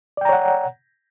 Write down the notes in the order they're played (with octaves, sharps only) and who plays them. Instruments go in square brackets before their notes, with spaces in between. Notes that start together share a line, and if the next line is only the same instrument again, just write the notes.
[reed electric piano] D5
G5
A#5
C#5
F#5